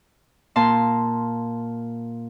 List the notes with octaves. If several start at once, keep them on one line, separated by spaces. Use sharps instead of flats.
A#2 A5 C6